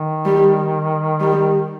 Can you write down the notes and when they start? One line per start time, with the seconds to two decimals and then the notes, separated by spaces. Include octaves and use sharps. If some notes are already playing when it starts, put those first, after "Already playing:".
Already playing: D#3
0.26 G3
1.20 G3